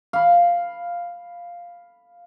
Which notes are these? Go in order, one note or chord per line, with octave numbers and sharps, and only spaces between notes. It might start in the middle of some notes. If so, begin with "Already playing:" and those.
F5 B5